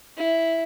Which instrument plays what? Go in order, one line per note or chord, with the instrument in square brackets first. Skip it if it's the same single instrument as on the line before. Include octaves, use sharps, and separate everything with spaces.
[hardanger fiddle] E4